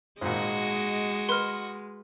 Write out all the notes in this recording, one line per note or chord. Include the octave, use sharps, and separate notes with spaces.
G#1 A#2 G#3 F#4 D#5
B4 C6 F6